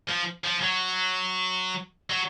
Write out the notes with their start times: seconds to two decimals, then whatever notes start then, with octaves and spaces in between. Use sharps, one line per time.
0.08 F3
0.44 F3
0.62 F#3
2.10 F#3